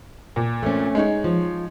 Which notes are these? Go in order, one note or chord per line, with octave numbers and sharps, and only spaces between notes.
A#2
A3 C4 C#4
G#3 D#4 C#5
F3